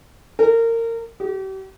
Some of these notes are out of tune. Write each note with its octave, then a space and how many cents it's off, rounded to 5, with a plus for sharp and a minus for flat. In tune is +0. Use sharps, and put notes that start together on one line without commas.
A#4 -25
G4 -40